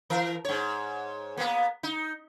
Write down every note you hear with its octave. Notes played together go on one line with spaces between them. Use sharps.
E3 A#4
G#2 C#5
A#3 B3
D#4